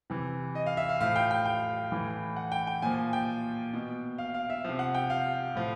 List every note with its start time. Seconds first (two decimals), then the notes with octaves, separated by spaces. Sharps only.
0.10 C3 E3
0.55 D#5
0.66 F5
0.77 E5
0.89 F5
1.00 A2 F3 F5
1.16 G5
1.31 G5
1.45 G5
1.91 A2 E3
2.36 F#5
2.52 G5
2.67 G5
2.82 A#2 F3 G#5
3.13 G5
3.74 B2
4.18 F5
4.34 F5
4.50 E5
4.64 C3 F3 F5
4.79 F#5
4.95 G5
5.10 F5
5.55 A2 F3